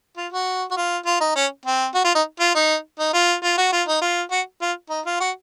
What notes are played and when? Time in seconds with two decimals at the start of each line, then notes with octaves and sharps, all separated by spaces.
0.17 F4
0.32 F#4
0.71 F#4
0.77 F4
1.06 F4
1.20 D#4
1.35 C#4
1.65 C4
1.94 F#4
2.04 F4
2.15 D#4
2.40 F4
2.55 D#4
2.99 D#4
3.14 F4
3.43 F4
3.57 F#4
3.72 F4
3.88 D#4
4.01 F4
4.31 F#4
4.61 F4
4.90 D#4
5.06 F4
5.20 F#4